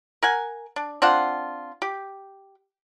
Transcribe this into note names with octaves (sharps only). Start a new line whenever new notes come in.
A#4 F#5 G#5
D4
C4 D4 F4 F#5
G4